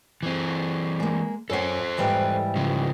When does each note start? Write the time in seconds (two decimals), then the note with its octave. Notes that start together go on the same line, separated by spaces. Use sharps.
0.23 E3 C4
1.00 G#3 A#3
1.50 F#2 A4 C5 F#5
1.97 G#2 E3 G3
2.56 C#3 F3